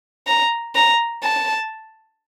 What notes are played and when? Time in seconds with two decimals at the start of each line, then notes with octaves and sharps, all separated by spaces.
0.27 A#5
0.75 A#5
1.23 A5